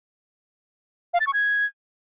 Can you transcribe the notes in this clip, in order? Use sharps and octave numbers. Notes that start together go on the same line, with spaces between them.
F5
A6
C#6
G#6